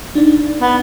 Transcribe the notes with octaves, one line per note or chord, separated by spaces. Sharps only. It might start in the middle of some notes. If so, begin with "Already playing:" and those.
D4 D#4 D5
B3